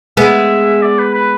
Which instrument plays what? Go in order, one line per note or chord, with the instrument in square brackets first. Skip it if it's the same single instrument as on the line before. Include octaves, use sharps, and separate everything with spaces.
[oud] G#3 B3 [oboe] E5
[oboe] D5
B4
B4